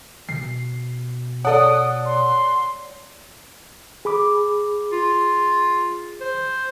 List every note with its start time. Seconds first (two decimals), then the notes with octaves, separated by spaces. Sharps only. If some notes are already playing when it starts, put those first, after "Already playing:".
0.29 B2 C7
1.45 A4 C#5 D5 F#5 D#6
2.06 C6
4.05 G#4 B5 D6
4.92 F4
6.21 C5